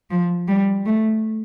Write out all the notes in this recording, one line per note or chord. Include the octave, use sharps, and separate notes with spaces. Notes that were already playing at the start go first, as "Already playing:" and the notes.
F3
G3
A3